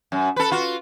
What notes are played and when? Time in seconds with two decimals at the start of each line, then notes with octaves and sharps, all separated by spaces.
0.12 F#2
0.36 A4 B4
0.52 F4 F#4